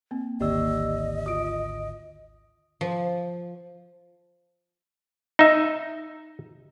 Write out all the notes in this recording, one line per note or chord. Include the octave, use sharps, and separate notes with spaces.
A#3 C4
G#1 D2 D#3 A#3 G4 D5 D#5 E6
F4 F#4 D#6 D7
F3
D#4 E5